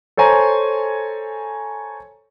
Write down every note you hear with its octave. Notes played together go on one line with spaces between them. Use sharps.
A4 C5 C#5 G#5 A#5